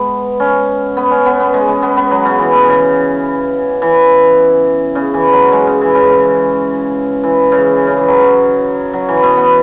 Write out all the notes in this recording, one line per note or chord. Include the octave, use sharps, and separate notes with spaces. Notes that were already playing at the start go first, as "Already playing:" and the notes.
Already playing: G#3 B3
C#4
B3
C#4
B3
B3
G#3
G#3
B3
B3
F#3
C#3
E3
B2
C#3
E3
C#3
E3
F#3
G#3
C#3
E3
C#3
C#3
E3
C#3
C#3
E3
F#3
F#3
E3
B2
B3